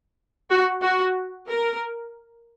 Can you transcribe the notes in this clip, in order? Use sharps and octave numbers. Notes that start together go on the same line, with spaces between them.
F#4
F#4
A#4